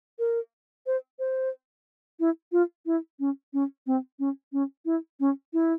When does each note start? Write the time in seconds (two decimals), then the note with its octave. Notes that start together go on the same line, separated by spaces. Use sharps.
0.19 A#4
0.86 C5
1.19 C5
2.20 E4
2.52 F4
2.86 E4
3.20 C#4
3.53 C#4
3.87 C4
4.19 C#4
4.53 C#4
4.85 E4
5.20 C#4
5.53 E4